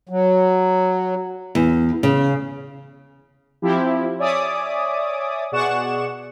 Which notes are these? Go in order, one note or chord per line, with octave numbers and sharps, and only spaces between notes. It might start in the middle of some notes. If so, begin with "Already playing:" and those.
F#3
E2
C#3
F3 C4 E4 G4
C#5 D5 E5 G#5 D6 D#6
B2 G#4 D5 F#5 C#6 E7